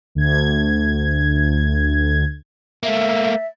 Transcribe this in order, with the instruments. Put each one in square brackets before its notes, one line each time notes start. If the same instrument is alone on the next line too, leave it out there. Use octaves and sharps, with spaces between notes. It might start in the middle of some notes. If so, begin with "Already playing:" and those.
[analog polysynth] D2 G#6
[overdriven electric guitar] A3 A#3 [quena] E5